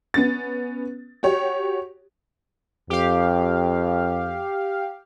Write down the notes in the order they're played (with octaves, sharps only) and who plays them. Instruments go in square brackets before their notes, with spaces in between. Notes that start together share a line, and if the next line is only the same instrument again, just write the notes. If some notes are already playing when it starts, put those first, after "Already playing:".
[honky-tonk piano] B3 C#4 A6
F#4 G4 C#5
[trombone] F2 [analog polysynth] G4 F5